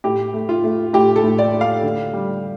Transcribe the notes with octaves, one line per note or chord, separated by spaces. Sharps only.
A2 G4
A3
F4
A3
A2 G4
A4
A2
D5
A3
F5
D3
G3